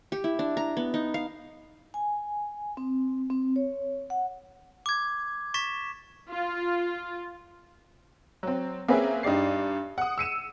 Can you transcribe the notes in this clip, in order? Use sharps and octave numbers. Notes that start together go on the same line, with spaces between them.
G4
E4
D4
A#5
B3
D#4
F5
G#5
C4
C4
C#5
F#5
D6 G#6
C#6 A6 B6 E7
F4
F#3 C4
A#3 C4 C#4 G#4 B4 E5
G2 D#4 G4 D5 C7
F#5 D#6
E6 C#7 D#7 E7